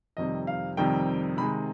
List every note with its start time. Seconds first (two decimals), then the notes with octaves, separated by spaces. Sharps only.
0.17 F2 C3 D#3 G3 D#5
0.47 F5
0.77 F2 C3 D#3 G3 G5
1.37 C3 D#3 G#3 B5